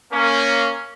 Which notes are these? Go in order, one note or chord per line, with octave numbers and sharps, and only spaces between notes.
A#3 C#4